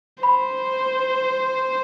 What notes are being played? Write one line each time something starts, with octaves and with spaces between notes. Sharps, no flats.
C5 B5